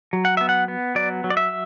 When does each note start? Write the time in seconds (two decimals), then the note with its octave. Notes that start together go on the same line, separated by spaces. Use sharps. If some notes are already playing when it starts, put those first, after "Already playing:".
0.13 F#3
0.25 F#5
0.37 B3 E5
0.49 F#5
0.68 B3
0.95 F#3 D5
1.24 F#3
1.30 D5
1.37 E5